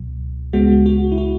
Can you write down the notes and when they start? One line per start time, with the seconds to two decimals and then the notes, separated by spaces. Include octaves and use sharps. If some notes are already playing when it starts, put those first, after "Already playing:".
Already playing: C#2 B2 F#3
0.53 C#2 C#3 G#3 B3 F#4
0.86 F#4
1.12 E4
1.18 F#4